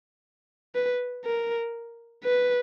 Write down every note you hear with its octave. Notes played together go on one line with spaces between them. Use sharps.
B4
A#4
B4